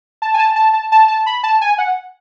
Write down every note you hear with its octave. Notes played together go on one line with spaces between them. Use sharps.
A5
G#5
A5
A5
A5
A5
A5
B5
A5
G#5
F#5